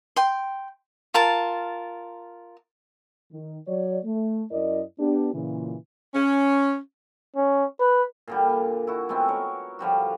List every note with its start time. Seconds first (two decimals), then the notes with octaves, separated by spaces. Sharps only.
0.16 G5 C6
1.14 F4 A#4 A5
3.32 D#3
3.68 F#3 C#5 D5
4.05 A3
4.51 F#2 E4 A#4 D5 D#5
5.00 B3 D4 G4
5.34 A#2 C#3 E3
6.15 C#4
7.36 C#4
7.80 B4
8.28 A#2 D3 G3
8.49 G#5
8.87 E4 F#4
9.09 G#3 A3 B3 C4
9.29 A#4 C#5
9.79 D3 F3 G3 F#4